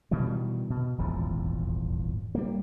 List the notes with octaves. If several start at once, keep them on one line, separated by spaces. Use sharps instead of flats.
B2 D#3 E3 G3
B2
D#1 G#1 E2 F3
G3 A#3